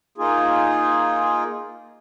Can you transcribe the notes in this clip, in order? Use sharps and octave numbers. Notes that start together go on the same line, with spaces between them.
A#3 D#4 F4 G#4